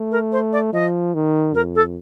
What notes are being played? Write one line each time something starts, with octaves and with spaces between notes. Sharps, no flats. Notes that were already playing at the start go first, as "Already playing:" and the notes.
Already playing: A3
A#4
C5
D5
F3 D#5
D#3
F2 A#4
A4